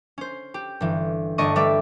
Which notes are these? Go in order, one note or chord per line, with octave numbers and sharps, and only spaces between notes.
C#4 C5
G4
G1 E3
G1 A3 D5 D#5 C#6 D#7
G3 B4 D5 E5 D6